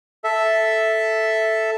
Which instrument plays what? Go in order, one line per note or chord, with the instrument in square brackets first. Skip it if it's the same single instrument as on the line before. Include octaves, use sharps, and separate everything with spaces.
[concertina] A4 E5